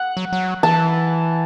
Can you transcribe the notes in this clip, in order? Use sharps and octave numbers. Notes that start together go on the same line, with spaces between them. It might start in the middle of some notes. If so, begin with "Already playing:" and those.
Already playing: F#5
F#3
F#3
E3 A5